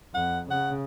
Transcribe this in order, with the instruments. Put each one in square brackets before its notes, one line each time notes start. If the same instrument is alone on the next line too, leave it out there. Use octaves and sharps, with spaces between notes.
[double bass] F2 [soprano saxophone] F#5
[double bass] C#3 [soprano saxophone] F#5